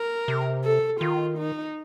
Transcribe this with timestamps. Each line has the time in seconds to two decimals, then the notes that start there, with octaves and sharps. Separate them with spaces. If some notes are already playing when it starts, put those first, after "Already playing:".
Already playing: A#4
0.28 C3
0.64 A4
1.00 D#3 F4
1.38 D#4